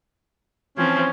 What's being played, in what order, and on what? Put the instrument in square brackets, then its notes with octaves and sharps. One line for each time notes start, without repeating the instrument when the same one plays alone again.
[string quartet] E3 F3 C4 [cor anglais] C#4